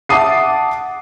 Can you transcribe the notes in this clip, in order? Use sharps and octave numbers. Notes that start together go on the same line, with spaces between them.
E5 F#5 A5 D6 D#6 C7